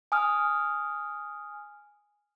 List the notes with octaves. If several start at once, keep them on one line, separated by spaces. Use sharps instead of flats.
G#5 D#6 F6